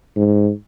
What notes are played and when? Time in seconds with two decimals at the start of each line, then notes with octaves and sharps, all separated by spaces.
0.17 G#2